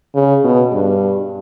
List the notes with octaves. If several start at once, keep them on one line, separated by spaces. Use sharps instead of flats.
C#3
B2
G2